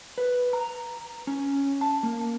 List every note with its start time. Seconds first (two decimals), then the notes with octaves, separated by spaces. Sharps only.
0.18 B4
0.53 A#5
1.27 C#4
1.81 A5
2.03 A#3